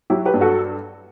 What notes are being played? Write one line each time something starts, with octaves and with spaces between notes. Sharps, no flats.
F#3 E4 G4
G4 B4
G2
F#4 A4